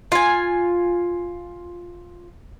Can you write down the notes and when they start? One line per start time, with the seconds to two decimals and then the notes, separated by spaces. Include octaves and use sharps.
0.12 F4 G#5